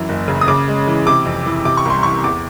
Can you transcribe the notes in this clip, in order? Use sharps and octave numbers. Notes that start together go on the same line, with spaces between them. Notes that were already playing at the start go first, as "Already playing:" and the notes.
Already playing: F#2 E3
F#1
C#3
D#6
C#3 D6
G#3
E3
C3 D6
F2
E3
C3 D6
C#6
C2 C6
E3 C#6
E2 D6